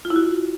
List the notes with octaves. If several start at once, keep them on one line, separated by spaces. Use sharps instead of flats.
F4
E4
F#4